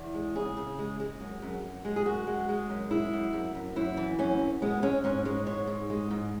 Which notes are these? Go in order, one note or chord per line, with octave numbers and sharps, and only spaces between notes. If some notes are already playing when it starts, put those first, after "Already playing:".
Already playing: E2
G#3
C#3 G#4
C#3
G#3
G#3
F#2
F#2
F#2
G#3
G#4
F#2 F#4
G#3
G#3
F#2
G#3 E4
F#2
F#2
F#2
F#2 E4
E3
F#2 C#4
F#2
G#3 B3
G#3 C#4
G#2 C#4
G#3 C#5
G#2 C#5
G#2
G#3
G#2